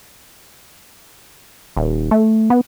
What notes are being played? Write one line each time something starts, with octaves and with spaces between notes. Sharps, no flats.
D#1
A3
B3